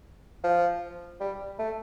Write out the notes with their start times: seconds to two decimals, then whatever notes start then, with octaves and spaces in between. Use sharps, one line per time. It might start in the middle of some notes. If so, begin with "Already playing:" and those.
0.44 F3
1.20 G3
1.59 A3